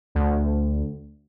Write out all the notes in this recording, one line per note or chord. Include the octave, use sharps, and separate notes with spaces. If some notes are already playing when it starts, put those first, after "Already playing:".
D2